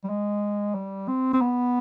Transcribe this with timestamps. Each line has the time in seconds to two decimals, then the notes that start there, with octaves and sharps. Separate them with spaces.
0.04 G3
0.09 G#3
0.74 G3
1.08 C4
1.33 C4
1.41 B3